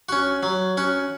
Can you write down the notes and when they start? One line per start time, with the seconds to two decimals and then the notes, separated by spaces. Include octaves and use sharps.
0.09 C#4 F#4
0.43 F#3
0.77 C#4 F#4